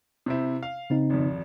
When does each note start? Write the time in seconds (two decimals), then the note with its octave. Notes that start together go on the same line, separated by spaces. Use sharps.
0.26 C3 C4 E4
0.63 F5
0.90 C#3 C4 D#4
1.10 G#1 F2